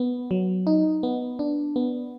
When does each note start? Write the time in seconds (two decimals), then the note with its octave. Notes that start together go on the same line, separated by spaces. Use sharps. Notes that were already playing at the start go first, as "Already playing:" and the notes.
Already playing: B3
0.31 F#3
0.67 D#4
1.03 B3
1.39 D4
1.76 B3